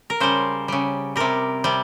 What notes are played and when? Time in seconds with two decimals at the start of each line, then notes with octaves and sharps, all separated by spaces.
0.10 A#4
0.20 C#3 G3 C5
0.68 C#3 G3
1.16 C3 G3 A#4
1.64 C3 G3